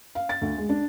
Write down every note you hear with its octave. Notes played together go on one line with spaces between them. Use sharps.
F5
A6
D2
G#3
D4